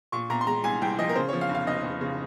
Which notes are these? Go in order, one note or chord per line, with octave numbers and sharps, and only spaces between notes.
A#2 C#6
A#2 A#5
C6
G#3 A#5
C2 G#5
C2 G5
F3 D#5
A#4
C#3 C5
F3 C#5
F5
F1
F5
F1 D#5
F1
C#3